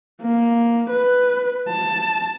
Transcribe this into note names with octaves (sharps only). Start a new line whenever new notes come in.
A#3
B4
A5